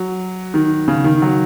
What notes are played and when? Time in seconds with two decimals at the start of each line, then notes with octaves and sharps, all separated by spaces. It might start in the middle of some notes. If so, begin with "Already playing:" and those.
Already playing: F#3
0.54 D#3
0.88 C#3
1.04 D#3
1.22 F#3